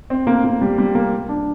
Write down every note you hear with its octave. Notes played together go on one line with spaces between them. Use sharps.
C4
A#3
A#3
G3
G3
A#3
D4